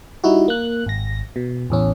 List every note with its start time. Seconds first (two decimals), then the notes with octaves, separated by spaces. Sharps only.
0.24 G3 D#4 E4 F#4
0.48 A#3 F#6
0.86 G#1 A#6
1.36 B2
1.70 A1 E2 C#4